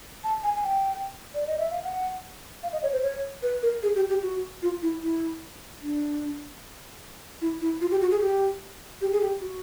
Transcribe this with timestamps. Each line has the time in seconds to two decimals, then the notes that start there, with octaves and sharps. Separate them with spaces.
0.24 A5
0.43 G#5
0.56 G#5
0.64 G5
1.35 D5
1.47 D#5
1.59 E5
1.71 F5
1.83 F#5
2.63 F5
2.73 D#5
2.83 C#5
2.93 C5
3.03 C#5
3.42 B4
3.63 A#4
3.83 G#4
3.96 G4
4.09 G4
4.23 F#4
4.62 F4
4.82 E4
5.02 E4
5.82 D4
7.42 E4
7.61 E4
7.81 F4
7.91 G4
8.01 F#4
8.11 G#4
8.21 G4
9.01 G4
9.13 G#4
9.21 G4
9.41 F#4